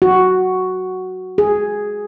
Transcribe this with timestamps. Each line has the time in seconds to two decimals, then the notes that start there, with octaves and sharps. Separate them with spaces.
0.02 F#4
1.38 G#4